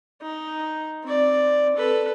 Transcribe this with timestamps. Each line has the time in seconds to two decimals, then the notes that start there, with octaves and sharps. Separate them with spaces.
0.22 D#4
1.04 C4 D5
1.76 A4 B4